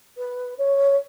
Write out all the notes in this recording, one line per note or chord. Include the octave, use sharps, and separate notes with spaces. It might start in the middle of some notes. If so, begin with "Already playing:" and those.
B4
C#5